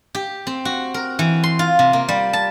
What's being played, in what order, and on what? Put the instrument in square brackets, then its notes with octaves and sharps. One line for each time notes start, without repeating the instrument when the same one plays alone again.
[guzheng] G4
C4
F#4
A#4
E3
C6
F4
C3
A#3
G3
A5